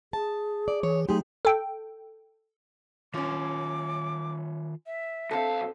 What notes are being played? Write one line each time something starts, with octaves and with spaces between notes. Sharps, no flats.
G#4 A5
D5
E3 C#5
F#3 A3 D#4 G4 G#4 C6
A4 G5
F#2 D#3 C#4 F4 D6
E5
B1 C4 A4 F5